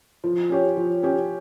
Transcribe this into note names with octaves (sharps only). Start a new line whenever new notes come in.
F3
C#4 G4 C#5
F3
C#4 G4 C#5